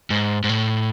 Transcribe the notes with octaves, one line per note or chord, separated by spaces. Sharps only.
G#2
G#2
A2